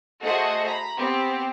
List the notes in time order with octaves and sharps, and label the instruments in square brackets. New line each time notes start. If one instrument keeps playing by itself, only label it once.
[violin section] A3 F#4 G#4 C5 D#5 F#5
A#5 B5
B3 C4 G4